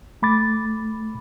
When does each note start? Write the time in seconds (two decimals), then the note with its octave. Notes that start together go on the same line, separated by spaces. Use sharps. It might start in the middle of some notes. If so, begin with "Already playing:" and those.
0.22 A3 B5 D6 A6